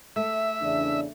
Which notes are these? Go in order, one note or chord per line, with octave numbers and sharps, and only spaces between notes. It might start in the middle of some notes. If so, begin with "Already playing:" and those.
A3 E5
E2 C#3 D4